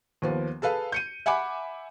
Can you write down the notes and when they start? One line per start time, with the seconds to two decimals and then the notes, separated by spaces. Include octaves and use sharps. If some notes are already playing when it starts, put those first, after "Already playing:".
0.22 D#2 F3 B3
0.62 G#4 A4 B4 F5 A5
0.92 G6 C#7 D#7
1.26 E5 F#5 G#5 B5 D6